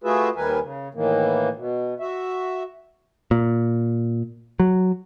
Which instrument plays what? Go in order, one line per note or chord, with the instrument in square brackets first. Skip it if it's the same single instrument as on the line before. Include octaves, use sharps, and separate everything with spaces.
[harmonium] A3 F4 F#4 G#4 B4 E5
D#2 D#3 G3 A#4 B4 G#5
C#3
A2 D#3 E3 A#3
B2
F#4 E5
[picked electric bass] A#2
F#3